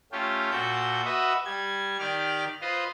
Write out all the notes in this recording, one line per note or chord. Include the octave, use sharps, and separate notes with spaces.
A3 C#4 F4 G4
A#2 F#4 A4 G6
F#4 B4 D#5 E5
G3 G#6
D#3 G4 D5 F6
F4 B4 C5 D#5